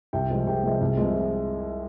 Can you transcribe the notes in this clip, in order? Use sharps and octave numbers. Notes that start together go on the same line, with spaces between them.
C2 G4 G5
C3 F3 G#3
C2 G4 G5
C3 F3 G#3
C2
C3 F3 G#3